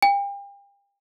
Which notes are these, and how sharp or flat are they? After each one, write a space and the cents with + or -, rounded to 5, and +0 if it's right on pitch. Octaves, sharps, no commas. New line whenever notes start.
G5 +40